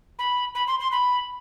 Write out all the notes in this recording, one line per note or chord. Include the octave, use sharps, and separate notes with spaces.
B5
B5
C6
C6
B5